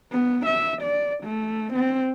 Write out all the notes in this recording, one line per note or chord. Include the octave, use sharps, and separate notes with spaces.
B3
E5
D5
A3
C4